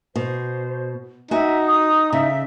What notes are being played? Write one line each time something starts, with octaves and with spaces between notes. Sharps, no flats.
B2 C5
D#4 F#4 E5 G#5
D#6
C#3 E5